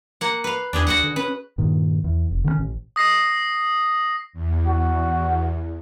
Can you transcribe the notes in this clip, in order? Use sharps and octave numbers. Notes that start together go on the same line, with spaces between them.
A#3 F#5
B4 F5
E2 D4 G4 G#4
D2 F#4 D#5 F#5
D3
C#4 B4
G2 A#2 D#3
E2
F1
D3 D#3 G3 C#4
A1
D#6 A#6 C7
E2
F#4